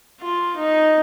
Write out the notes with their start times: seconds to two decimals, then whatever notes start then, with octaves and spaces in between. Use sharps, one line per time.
0.21 F4
0.57 D#4